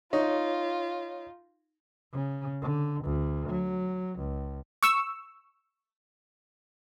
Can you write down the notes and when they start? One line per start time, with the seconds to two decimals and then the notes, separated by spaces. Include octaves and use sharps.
0.13 D#4 F4 C#5
2.12 C#3
2.62 D3
3.04 D2
3.49 F#3
4.19 C#2
4.83 C#6 E6